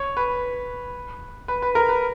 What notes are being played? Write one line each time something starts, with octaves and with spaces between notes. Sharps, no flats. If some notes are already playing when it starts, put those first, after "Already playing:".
Already playing: C#5
B4
B4
B4
A#4
B4